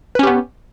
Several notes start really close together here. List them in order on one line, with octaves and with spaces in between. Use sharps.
B4 C#4 G4 B3